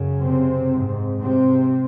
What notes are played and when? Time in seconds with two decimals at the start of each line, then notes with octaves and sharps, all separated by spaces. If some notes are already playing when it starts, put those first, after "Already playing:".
Already playing: F#2 C#3
0.24 C3 C4
0.72 G#2
1.20 C3 C4